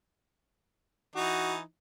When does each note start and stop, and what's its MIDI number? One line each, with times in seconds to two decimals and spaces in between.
1.15 1.60 52
1.15 1.60 63
1.15 1.55 66